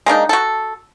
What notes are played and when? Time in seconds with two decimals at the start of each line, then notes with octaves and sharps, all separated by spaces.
0.06 G#3 A#3 D4 D#4
0.29 F#4 A4